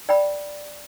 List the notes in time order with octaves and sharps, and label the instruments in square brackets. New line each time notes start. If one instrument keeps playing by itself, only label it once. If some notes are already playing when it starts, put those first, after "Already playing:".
[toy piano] D5 G5 B5